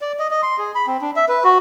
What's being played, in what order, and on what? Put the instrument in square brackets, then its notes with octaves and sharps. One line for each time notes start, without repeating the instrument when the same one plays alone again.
[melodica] D5
D#5
D#5
C6
G#4
B5
C4
D4
E5
B4
F#4